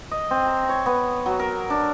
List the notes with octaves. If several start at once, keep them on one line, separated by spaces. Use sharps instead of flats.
D#5
C4
A#5
C#5
B3
F#3
A#4
D4